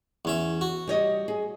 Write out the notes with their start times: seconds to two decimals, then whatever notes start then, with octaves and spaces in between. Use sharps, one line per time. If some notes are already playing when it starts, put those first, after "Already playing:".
0.25 E2 C#4 E5
0.61 F#4
0.87 G3 C#5 D#5
1.28 G#4